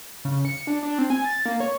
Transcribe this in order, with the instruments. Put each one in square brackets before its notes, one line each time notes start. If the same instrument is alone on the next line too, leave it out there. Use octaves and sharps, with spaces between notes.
[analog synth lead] C#3
C#7
D4
D4
C4
G#5
A6
A#3
C#5